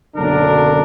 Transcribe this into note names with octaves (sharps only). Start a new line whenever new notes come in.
F#1 B1 D3 F#3 D4 A#4